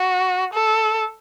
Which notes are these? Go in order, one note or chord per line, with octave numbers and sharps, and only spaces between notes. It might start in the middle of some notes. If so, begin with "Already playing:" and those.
Already playing: F#4
A4